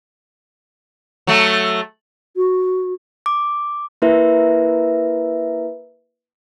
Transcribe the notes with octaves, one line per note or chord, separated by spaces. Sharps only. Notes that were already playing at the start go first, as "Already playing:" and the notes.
F#3 A3
F#4
D6
A#3 E4 A#4 B4 E5